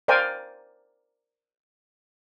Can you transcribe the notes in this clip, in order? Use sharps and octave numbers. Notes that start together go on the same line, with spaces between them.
A#4 C5 D5 F5 G5 G#5